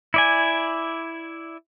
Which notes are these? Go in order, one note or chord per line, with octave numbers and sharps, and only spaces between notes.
E4 D5 G#5